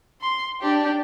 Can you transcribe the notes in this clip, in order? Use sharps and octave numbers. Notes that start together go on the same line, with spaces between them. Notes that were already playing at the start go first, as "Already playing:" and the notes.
C6
D4 G4